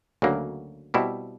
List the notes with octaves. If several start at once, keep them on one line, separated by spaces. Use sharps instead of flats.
D2 C#3 F#3 A#3
B2 G3 C4 E4